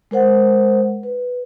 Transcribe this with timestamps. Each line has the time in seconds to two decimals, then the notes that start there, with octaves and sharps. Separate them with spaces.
0.11 G#3 A#4 C5 F#5
1.03 B4